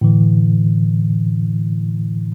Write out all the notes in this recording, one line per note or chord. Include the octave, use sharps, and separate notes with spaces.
A2 D3 E3